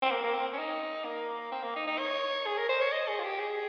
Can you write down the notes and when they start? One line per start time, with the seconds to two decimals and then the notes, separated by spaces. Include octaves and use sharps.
0.02 C4
0.11 A#3
0.23 A#3
0.34 C4
0.53 C#4
0.58 D#4
1.05 A#3
1.52 C4
1.63 A#3
1.76 D#4
1.87 D#4
1.98 C#5
2.46 G#4
2.58 A#4
2.69 C5
2.81 C#5
2.92 D#5
3.08 G#4
3.19 F4
3.24 G4
3.39 G#4